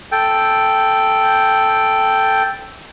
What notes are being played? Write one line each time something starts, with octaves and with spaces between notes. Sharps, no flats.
A4 G5